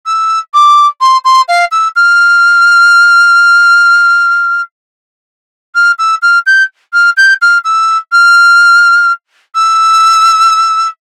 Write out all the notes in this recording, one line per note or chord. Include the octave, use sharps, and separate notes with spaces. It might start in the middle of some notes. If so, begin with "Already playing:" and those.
E6
D6
C6
C6
F5
E6
F6
F6
E6
F6
G6
F6
G6
F6
E6
F6
E6